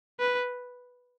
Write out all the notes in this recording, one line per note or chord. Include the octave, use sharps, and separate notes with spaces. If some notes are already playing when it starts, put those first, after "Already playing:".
B4